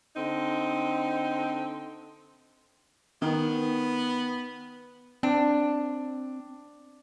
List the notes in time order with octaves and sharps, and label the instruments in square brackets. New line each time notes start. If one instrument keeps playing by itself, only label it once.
[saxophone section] D3 C4 D#4
[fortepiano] D#3 [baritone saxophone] B3
[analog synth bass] C4 [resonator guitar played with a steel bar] D4